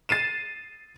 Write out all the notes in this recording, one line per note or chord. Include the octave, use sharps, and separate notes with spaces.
A6 C7 D#7 E7